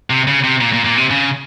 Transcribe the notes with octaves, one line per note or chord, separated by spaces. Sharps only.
C3
C#3
C3
A#2
A#2
A#2
C3
C#3